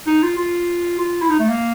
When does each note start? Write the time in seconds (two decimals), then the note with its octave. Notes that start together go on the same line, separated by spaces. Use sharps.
0.07 D#4
0.23 F4
0.37 F4
0.99 F4
1.22 E4
1.30 D#4
1.39 A3
1.49 A#3